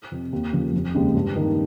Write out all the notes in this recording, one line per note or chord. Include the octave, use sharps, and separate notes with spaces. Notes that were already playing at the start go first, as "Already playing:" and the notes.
F2 C3
D#2
C#3 F3 A#3
F1
D#2 C#3 G#3 C#4
G2
D#3 A#3 D#4